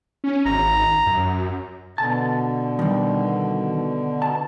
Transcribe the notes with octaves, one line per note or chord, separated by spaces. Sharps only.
C#4
G#1 A#5
F#2
B2 D3 A5
D#3 G3
A5